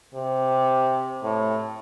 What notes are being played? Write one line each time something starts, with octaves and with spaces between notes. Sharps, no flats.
C3
A2